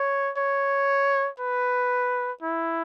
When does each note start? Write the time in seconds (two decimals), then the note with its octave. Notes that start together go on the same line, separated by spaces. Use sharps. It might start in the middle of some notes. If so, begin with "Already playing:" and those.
Already playing: C#5
0.37 C#5
1.40 B4
2.42 E4